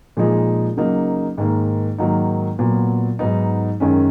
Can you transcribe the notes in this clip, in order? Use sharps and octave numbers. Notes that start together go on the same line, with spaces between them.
A#2 F3 G#3 D#4 G#4
C#3 F#3 A#3 D#4
G#2 D#3 A#3
G#2 D#3 F#3 A#3 D#4
A#2 F#3 B3
G#2 F#3 B3 D#4
F#2 D#3 G#3 C#4